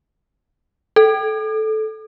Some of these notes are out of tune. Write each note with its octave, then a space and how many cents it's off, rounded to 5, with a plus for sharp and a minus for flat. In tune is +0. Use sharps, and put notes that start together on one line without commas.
A4 -15